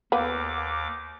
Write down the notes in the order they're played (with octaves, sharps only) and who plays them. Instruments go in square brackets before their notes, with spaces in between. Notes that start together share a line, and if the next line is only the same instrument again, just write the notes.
[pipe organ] D#2 D6 [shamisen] A#3 B3